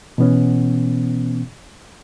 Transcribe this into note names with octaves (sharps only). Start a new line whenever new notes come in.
B2 E3 B3 C#4